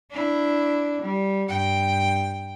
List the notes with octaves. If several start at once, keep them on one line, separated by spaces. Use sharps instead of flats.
D4 E4
G3
G2 G5